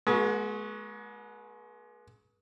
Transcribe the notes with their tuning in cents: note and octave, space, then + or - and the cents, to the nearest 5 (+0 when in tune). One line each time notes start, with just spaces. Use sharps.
G#3 +25 B3 -40 F#4 +0